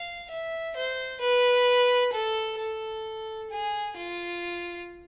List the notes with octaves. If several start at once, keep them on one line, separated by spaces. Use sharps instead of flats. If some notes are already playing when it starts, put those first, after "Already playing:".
Already playing: F5
E5
C5
B4
A4
A4
G#4
F4